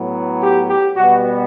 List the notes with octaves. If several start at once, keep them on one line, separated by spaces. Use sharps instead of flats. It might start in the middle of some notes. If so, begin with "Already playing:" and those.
Already playing: A2 F#3 B3
G4
G4
B2 G3 B3 F#4